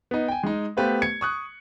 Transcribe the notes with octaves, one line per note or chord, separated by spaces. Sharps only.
B3 D#4
G5 G#5
G#3 D#4
A3 B3 G4 B4 C5 F5
G#6 C#7
C#6 D#6 F#6